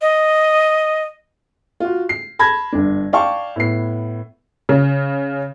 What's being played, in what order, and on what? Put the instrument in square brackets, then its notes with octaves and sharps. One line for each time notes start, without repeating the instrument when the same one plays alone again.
[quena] D#5
[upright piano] F4 F#4
C7
A5 B5 G#6 A#6
G1 D4
D5 F5 G5 A5 C#6
A2 B3 C7
[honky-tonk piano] C#3